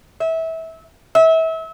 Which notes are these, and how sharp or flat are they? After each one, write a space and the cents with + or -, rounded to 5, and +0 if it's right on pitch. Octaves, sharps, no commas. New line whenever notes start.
E5 -25
E5 -30